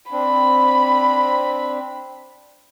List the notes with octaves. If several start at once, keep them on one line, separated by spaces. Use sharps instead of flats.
C4 D4 B5